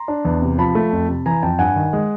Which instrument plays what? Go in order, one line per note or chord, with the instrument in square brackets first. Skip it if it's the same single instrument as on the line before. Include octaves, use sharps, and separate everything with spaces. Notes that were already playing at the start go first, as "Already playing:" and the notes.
Already playing: [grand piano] A#5 C6
D4
E2
C3
F3 A5 B5
A3
F2
C3
E3 G#5 A#5
F2 G5 A5
G2 F#5 G#5
D#3
G#3